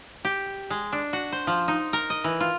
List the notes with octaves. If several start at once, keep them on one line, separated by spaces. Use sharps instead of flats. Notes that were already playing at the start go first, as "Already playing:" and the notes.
G4
G#3
D4
F#4
C5
F3
D#4
A#4
D#5
E3
F4